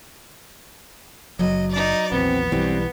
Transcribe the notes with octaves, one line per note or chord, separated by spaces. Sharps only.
F#1 F#3 D#5
D#4 D5
A#1 E2 B3 C4
B1 E3 G3 C4